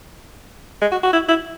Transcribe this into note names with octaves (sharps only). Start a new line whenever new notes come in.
G#3
F#4
F#4
E4
E4